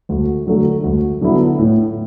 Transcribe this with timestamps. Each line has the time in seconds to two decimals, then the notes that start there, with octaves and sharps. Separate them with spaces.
0.09 D2
0.47 D3 F#3 A3
0.84 D2
1.21 D3 F#3 B3 E4
1.58 A2